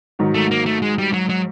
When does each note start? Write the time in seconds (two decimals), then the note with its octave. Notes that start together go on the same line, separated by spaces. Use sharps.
0.19 G#2 D#3 F#3
0.34 A3
0.51 A#3
0.66 A3
0.82 G#3
0.98 G3
1.14 F#3
1.29 F#3